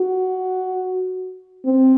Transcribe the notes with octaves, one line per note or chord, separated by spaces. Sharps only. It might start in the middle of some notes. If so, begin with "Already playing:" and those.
Already playing: F#4
C4